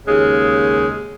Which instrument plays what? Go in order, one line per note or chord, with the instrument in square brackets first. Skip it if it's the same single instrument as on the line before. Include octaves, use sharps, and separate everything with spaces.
[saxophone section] D#2 C#3 G#3